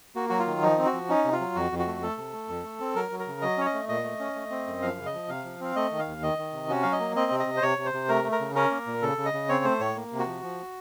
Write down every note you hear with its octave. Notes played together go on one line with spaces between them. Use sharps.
A#3 F#4
F#3 F#4
F4
D#3
F3 D#4
C4
F#4
F3
C#4 D#4
C3
F4
F#3
F2 F#4
F2
F#4
A3
A3 A4
C3
A3
F2
A3
C4
F#3 A#4
F#3
A#4
C#3
F#3 D#5
C#4 C#5
D#5
A3
A#2 D#5
A3
C#4
A3
C4
F#2
F3 F5
C#3
D#5
F3
C3 F5
F3
C4 F5
A3 D#5
D#3
F5
D#2
D#3 D#5
D#3
C3
C#4 F#4
F#3 F5
D#5
A#3
C4 D#5
C3
D#5
C3
C5
C3 C#5
C3
C5
C3
A3 A#4
A3
A#4
C#3
C#4 A#4
A#3
A#2
C#3 A4
C#3
D#5
C#3
C4 C#5
A3 C5
A2 C#5
A#3
C3
F#4
F3
F3